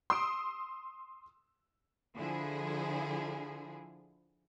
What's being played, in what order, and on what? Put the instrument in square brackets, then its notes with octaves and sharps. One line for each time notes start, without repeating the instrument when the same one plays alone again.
[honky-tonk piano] C6 D#6 E6 D7
[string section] D3 F3 E4 G#4